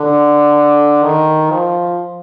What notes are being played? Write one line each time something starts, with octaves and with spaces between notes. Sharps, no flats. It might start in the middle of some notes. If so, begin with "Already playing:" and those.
Already playing: D3
D#3
F3